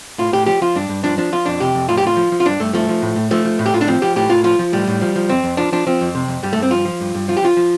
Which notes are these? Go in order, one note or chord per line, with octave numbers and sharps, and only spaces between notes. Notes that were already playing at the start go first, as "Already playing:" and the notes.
A2 F4
A2 G4
F3 G4
F3 F4
G2 D4
G2
F3 D4
F3 D4
F3 F4
F2 D4
C3 G4
F2
A2 F4
G4
A2 F4
F3
F3
F4
G2 D4
G2 A3
F3 A3
F3
A2
A2
F3 A3
F3
A2
G4
A2 F4
D4
F3 C4
F3 G4
A2 G4
A2 F4
F3 F4
F3
A2 G3
A2
F3
F3
F2 C4
F2
F3 D4
F3 D4
F3 C4
F2
C3
F2
G2 G3
A3
G2 C4
F3 F4
F3
G2
G2
F3 F4
G4
F3 F4
F3